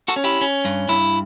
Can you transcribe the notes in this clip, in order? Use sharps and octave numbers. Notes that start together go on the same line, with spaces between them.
F#4 A4
C#4
E4 G4
C#4
G2
G2 E4